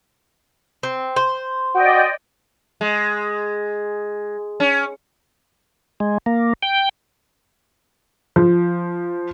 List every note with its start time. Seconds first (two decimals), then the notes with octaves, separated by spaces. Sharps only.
0.83 C4
1.16 C5
1.75 F#4 D5 D#5 G5
2.81 G#3
4.60 C#4
6.00 G#3
6.26 A#3
6.63 G5
8.36 F3